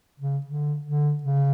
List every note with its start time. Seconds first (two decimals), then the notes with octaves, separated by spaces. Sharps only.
0.20 C#3
0.46 D3
0.85 D3
1.23 C#3